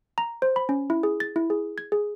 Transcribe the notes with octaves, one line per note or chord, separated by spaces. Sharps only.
A#5
C5
B5
C#4
E4
G#4
A6
E4
G#4
G#6
G#4